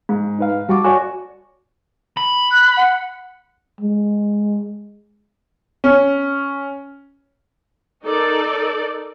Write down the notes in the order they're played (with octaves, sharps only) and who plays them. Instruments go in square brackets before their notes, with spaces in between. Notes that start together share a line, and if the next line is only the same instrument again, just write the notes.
[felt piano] G#2
[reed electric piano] D#4 B4 F5
[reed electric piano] G3 F#4 [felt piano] A5 C#6 D6
[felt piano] F#4 C#5 D5 [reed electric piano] G#5 C#6
[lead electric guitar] B5
[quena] F#6
F#5
[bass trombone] G#3
[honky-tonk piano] C#4
[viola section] D#4 A4 A#4 D5